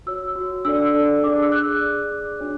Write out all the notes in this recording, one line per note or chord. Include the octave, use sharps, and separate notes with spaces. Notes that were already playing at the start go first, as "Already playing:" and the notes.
F#4 C#5 E6
F#4 C#5
D4 A4 D5 E6
D4 A4 D5
D4 G#4 D5 D6
D6
E6
D4 G#4 D5 F#6
G#4 D5
G#4 D5 D6
D4 F#4 C#5